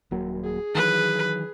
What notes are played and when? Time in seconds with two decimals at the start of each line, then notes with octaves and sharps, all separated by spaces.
0.11 D#1 F#3 A#3
0.44 G#4
0.75 D#3 E3 F#3 B4